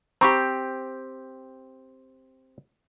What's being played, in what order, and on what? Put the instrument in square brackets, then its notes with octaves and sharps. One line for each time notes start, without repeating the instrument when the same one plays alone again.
[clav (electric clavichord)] C4 G4 [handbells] A#5 B5 C#6